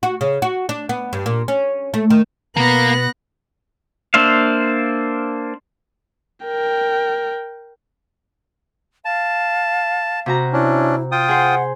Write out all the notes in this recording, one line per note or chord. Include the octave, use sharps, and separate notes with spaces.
F#4
C#3
F#4
D4
B3
G2
A#2
C#4
A3
D#3
B2 A#3 B3 F#6 A#6
A#3 D4 C5 E5 F5
A#4 G5
F5 A5
C3 F#4 A#5
C#4 D4 E4
F4 G5 D#6
G#4 C5 F#5